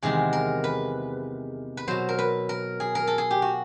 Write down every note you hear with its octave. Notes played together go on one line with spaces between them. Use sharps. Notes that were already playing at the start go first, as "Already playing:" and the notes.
E2 C3 D#3 G#3 G#4
A#4
B4
B4
B2 F#3 C5
A#4
B4
A#4
G#4
A#4
A4
G#4
G4
F#4